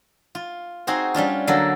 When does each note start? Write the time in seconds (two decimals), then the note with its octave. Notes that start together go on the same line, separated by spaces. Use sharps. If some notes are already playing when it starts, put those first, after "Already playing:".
0.35 F4
0.87 C4 D#4 F#4 G#4 C5
1.14 G3 C#4 D4 F4
1.47 D3 F#3 A#3 A4